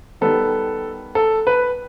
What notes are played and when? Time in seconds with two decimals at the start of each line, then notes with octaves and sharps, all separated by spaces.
0.21 D#3 G3 B3 A4
1.15 A4
1.47 B4